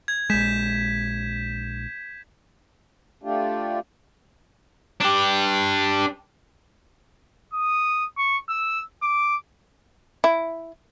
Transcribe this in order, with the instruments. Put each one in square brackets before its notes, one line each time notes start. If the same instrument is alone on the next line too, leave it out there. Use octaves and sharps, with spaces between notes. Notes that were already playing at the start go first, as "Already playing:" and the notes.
[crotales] G#6
[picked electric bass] A#1 G#3 [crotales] G6 B6 E7
[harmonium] A3 D4 F4 G4
[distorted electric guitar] D4 G4
[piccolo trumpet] D#6
C#6
E6
D6
[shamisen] E4